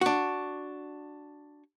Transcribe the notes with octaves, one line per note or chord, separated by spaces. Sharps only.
D4 F#4